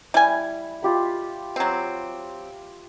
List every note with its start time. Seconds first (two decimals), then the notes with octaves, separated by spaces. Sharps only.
0.14 G3 E4 G#5
0.83 F4 G4 B5
1.56 F#3 C4